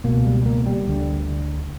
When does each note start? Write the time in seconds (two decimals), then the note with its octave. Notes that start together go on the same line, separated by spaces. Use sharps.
0.04 C#2 B2 A#3
0.25 G3
0.46 A#3
0.66 G3
0.88 D2 D3